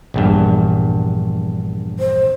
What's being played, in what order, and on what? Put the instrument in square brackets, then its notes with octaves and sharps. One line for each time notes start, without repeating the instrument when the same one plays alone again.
[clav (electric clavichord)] A#1 E2 G2
[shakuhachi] C5